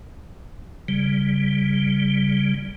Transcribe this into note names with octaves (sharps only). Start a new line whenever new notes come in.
C#3 G3